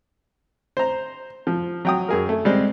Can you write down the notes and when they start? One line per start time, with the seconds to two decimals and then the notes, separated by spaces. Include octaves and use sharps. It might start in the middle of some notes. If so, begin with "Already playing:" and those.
0.77 C5 A#5
1.47 F3
1.85 F#3 G5 D#6
2.08 F#2 G#4 A#4
2.29 A3
2.45 G3 G#3 C4